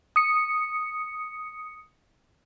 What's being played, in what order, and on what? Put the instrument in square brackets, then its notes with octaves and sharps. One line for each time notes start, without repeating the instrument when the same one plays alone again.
[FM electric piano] D#6 C#7